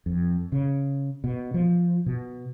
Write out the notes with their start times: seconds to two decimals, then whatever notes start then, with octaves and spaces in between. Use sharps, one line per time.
0.06 F2
0.52 C#3
1.24 B2
1.54 F3
2.06 B2